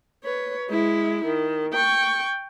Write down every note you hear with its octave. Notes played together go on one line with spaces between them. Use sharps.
B4 C#5
G#3 E4
D#3
G5 C#6